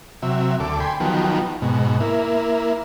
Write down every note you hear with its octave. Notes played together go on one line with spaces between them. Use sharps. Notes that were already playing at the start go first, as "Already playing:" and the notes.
C3 F#3 E5
D2 A4 D6
G5 G#5 B5 C6
D#3 F3 F#3 B3 G4
G#2 B2
A#3 E4